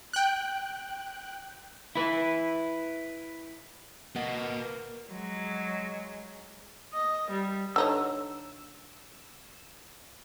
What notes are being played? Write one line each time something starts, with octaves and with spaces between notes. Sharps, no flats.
G5 F#6
E4 B4
A#3 F#4 B4 D#5
F#3 G#3
D#5
G3
D3 D#4 C#5 E6